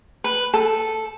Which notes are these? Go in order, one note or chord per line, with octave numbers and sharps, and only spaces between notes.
B4
A4